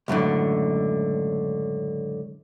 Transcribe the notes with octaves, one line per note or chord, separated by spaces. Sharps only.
C#2 F#2 A2 D3